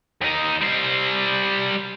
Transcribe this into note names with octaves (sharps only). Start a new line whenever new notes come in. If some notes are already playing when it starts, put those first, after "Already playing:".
D#2 D#4
G3 C5